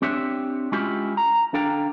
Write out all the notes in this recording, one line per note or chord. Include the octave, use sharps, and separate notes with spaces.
C4 D4 G4 C#5 E5
G#3 C#4 E4 F4 G4
A#5
D3 D4 A4 F5 G5 A#5